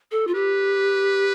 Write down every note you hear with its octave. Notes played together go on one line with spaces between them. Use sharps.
A4
F4
G4 B4